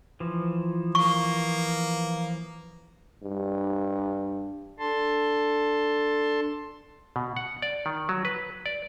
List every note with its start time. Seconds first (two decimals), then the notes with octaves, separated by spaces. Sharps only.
0.20 E3 F3
0.95 A#3 C#6
3.22 G2
4.79 D4 A4 A5 C6
7.16 B2
7.37 F#5
7.62 D5
7.86 D#3
8.09 F#3
8.25 B4
8.66 D5